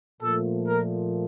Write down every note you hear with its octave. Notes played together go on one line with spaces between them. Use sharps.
A#2 F3 A3 A4
A#4